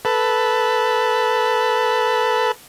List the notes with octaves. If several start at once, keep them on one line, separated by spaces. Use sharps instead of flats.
A4 B4